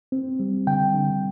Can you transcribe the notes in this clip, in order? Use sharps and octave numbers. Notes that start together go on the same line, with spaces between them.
C4
G3
D3 G5
D3